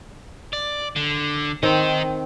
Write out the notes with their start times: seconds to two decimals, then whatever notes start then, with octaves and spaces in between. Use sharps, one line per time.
0.53 D5
0.96 D3
1.63 D#3 C4 D#4 A#4